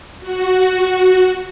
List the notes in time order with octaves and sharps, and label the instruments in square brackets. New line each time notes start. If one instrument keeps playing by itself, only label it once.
[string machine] F#4